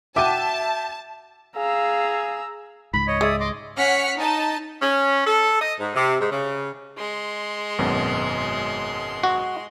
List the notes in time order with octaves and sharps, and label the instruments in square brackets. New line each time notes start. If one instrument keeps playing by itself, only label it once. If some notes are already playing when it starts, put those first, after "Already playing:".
[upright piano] F#4 G5 D6 [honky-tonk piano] E5 D#7 [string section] A5
[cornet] G#4 [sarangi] F5 [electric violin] A#5 E6
[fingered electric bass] C#2 G#2 [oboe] B5
[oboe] C#5 [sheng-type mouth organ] D#5
[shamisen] G#3 [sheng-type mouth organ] D5 E5 D#6
[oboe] D#5 [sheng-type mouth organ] C6 D6
[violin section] C#4 F#5 F6 B6 C#7
D#4 A5
[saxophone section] C#4
A4
D#5
G#2
C3
G#2
C#3
[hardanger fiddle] G#3 C6
[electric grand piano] G#1 F#2 B2
[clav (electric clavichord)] F#4